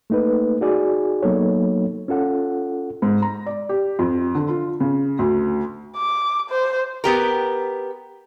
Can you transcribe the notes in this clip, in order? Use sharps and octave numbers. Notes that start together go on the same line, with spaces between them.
A3 A#3 D#4 A4 B4
D#4 F#4 G#4 D5 G#5
F#3 A#3 B3 D#4 A4 C#5
C#4 F4 A4 F#5
G#2
A#5
D5
G4
F2
D3
F4
C#3
D2
D6
C5
B3 G4 A#4